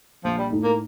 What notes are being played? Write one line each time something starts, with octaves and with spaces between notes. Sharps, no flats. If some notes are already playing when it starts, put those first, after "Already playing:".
A#1 F3
G3
A2 A3 D#4
A#3